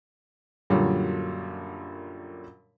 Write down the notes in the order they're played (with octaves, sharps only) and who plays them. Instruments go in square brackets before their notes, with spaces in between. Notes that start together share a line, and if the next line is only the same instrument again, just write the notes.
[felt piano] F#2 A#2 D3 F#3 G3